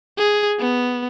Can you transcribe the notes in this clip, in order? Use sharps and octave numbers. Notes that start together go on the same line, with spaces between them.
G#4
B3